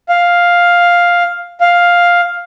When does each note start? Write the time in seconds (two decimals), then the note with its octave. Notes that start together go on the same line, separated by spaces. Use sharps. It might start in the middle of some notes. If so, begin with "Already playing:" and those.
0.09 F5
1.61 F5